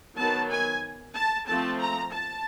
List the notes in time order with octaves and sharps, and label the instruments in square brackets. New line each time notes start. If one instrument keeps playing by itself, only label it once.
[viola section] D#3 F#3 B3 A5
G#5
A5
F3 A3 C4 A5
A#5
A5